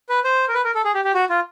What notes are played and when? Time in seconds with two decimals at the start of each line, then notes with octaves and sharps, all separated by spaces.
0.09 B4
0.24 C5
0.48 A#4
0.54 B4
0.64 A#4
0.75 A4
0.84 G#4
0.94 G4
1.05 G4
1.14 F#4
1.30 F4